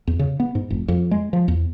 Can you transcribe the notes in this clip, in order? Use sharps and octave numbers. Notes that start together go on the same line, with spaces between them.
E2
C#3
B3
G#2
F1
F2
G#3
F3
E2